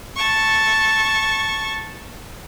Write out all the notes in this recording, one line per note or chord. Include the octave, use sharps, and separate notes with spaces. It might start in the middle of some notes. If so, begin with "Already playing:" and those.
A5 C#6